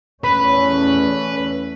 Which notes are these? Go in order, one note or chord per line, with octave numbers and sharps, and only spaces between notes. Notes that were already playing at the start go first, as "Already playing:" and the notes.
E2 A3 C#4 B4 B5